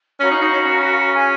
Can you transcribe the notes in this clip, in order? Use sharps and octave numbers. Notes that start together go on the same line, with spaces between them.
C#4 F#4 A#4 F5 B5
D#4
D#4
C#4
C#4
G#4 C#5 F5 G#5